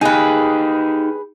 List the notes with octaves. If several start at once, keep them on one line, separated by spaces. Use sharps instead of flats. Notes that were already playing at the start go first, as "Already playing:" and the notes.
D#4 G4 G#4 B4